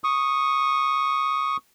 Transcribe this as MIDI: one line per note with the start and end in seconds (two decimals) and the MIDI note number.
0.04 1.57 85
0.04 1.57 87